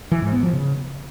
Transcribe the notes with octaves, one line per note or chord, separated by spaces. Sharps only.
E3
G#2
B3
F3
C#3